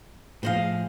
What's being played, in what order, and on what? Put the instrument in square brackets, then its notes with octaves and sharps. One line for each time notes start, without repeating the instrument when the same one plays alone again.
[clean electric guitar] A2 F3 G#4 [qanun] C5 D#5 F5